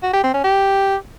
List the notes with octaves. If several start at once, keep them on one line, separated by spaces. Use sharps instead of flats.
F#4
G4
C4
C#4
G4